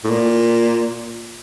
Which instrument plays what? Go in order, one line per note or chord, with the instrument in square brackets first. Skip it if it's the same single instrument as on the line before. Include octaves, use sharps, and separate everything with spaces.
[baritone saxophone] A2
A#2